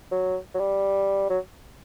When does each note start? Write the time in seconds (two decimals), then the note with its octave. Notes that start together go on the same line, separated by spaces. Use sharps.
0.11 F#3
0.54 F#3
0.59 G3
1.30 F#3